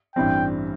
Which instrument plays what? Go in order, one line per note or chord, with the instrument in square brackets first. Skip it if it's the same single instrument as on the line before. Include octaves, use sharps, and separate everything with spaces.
[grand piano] A1 G2 E3 G3 C4 [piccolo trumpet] G5